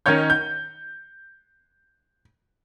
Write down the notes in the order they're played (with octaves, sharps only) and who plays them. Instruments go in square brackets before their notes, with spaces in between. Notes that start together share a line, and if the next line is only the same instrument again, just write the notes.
[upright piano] D#3 C#4 D#4 C#5 G6
G6